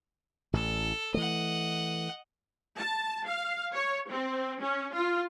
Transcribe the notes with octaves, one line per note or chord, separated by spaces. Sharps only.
A1 A2 A4
E3 A3 D#5 F#5
A5
F5
C#5
C4
C#4
F4